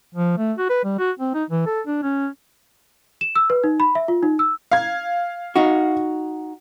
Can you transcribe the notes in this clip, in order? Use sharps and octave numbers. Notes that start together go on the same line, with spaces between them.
F3
A3
F#4
B4
G3
F#4
C4
D#4
E3
A4
D4
C#4
E7
E6
B4
D#4
B5
E5
F4
D#4
E6
F5 G#6
D#4 F#4